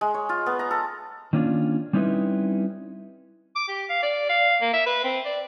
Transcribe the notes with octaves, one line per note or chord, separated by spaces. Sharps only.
G#3
C#5
F4
B3
A#5
A4
D#3 A#3 C#4 D4 F4
G3 C4 C#4 D#4 E4 B4
D6
G4
F5
D5
F5
A#3
E5
B4
C4
D5